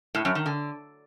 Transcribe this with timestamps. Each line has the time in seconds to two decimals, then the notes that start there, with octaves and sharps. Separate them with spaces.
0.15 A2
0.25 F#2
0.35 D#3
0.46 D3